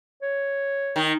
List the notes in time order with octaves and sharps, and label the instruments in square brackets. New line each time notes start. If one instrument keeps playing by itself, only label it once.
[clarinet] C#5
[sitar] D#3